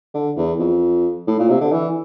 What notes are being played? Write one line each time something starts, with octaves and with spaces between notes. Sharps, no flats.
D3
E2
F2
A2
A#2
C3
D3
E3